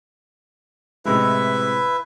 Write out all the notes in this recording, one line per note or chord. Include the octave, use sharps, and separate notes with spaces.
A2 C3 G#3 E4 B4 E5